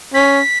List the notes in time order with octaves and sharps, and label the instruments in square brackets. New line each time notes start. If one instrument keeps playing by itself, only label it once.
[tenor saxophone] C#4 [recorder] B6